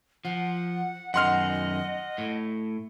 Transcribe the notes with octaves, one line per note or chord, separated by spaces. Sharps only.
F3 F#5
F#2 D#3 D#5 F#5 C6 F6
A2